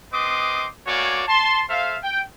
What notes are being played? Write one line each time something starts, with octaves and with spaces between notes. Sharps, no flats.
C4 B4 D#5 C6 D6 D#6
A3 A#3 F#4 C#5 D5 G#5
A5 C6
A4 C5 E5 F5
G5